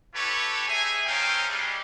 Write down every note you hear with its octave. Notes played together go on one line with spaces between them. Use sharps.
E4 G4 A4 B4 C#5
D#4 G#4 E5 G#5
A3 C4 C#4 D#4 F5 G5
G3 G#3